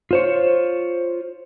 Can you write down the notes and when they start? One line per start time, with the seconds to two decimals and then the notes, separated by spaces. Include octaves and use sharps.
0.11 F4 C5 C#5